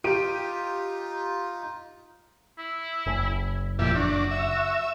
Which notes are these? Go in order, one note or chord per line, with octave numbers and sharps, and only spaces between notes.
D#4 F4 G4 D7 D#7
E4
F#1
F2 A#2 E4 G4
D4 F#4
E5